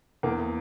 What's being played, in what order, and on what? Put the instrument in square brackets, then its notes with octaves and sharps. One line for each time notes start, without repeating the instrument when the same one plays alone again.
[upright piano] E2 A#3